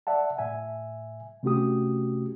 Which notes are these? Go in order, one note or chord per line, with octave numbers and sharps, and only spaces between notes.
D5 E5 F#5 A5
A2 E5 G#5
C3 A3 C#4 F#4 G4 D#6